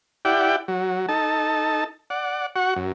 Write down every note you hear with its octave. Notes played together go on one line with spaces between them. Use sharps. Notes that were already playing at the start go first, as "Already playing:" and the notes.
E4 G4 D5 F#5 G5
F#3
D#4 A4 A5
D5 F#5
F#4 F#5 C#6
F#2